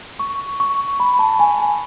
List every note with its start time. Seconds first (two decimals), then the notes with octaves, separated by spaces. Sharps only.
0.19 C#6
0.60 C#6
1.00 B5
1.19 A5
1.39 G#5
1.60 G#5